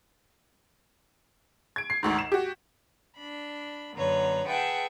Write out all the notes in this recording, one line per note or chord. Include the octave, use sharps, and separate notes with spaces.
G#6 D7
C7
G#1 D2 G#2
E7
F#4 G4
D4 B5
F#2 D3 A#3 B4 C#5 A#5
G#4 B4 E5 F#5 G5 A5